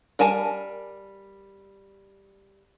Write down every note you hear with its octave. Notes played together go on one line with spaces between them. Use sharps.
G3 A#4 G#5 A5